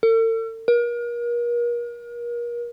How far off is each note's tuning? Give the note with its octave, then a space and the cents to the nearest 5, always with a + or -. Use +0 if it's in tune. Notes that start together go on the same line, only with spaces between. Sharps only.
A4 +45
A#4 +35